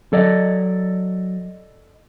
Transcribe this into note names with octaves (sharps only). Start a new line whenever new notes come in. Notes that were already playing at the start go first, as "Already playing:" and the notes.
F#3 A4 D5 D#5